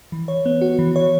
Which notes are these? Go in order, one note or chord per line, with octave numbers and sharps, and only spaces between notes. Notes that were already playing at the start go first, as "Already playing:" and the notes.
E3
C#5
B3
F#4
E3
C#5